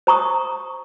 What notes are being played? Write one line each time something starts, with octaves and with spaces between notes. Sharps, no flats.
C5 A#5 C#6 D#6